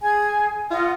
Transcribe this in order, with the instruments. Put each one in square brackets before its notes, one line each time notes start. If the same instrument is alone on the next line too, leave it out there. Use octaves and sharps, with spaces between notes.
[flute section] G#4 G#5
[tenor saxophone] F4 [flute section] D#5 F#5